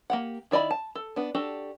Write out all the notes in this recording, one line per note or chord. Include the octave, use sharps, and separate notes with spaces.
A#3 G4 F#5
D#3 E4 D5 D#5 B5
A5
A4
B3 D4
D4 F#4 G4 A4